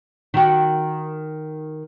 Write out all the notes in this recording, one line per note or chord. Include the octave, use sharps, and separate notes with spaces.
D#3 F#4